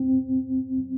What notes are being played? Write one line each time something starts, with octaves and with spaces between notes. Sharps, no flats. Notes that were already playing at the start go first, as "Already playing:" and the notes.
Already playing: C4